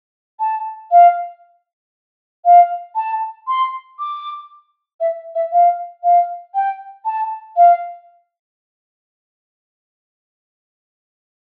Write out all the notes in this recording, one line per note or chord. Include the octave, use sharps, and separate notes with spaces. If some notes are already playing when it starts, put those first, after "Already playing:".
A5
F5
F5
A5
C6
D6
E5
E5
F5
F5
G5
A5
F5